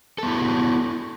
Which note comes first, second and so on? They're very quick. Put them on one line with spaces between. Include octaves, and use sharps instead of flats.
A4 B3 E4 F#4